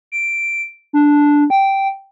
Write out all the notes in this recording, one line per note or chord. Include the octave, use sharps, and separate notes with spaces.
D7
D4
G5